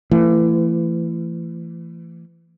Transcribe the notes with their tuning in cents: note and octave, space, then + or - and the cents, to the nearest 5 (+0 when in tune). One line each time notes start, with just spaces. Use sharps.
E3 +30 A3 +35